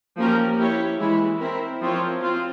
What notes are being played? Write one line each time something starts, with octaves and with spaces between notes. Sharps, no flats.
F3 A#3 C#4 G4 A#4
A#3 E4 G4 C#5
E3 G#3 E4
C4 E4 A#4
F3 C4 F4 A#4 C#5
C4 F4